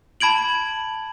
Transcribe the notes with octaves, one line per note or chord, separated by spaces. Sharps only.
A5 B5 G#6 D7 F#7